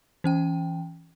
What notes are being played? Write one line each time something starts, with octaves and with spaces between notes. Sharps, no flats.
E3 C#4 G5